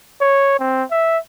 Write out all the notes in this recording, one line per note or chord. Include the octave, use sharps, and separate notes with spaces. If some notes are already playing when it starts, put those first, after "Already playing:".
C#5
C4
E5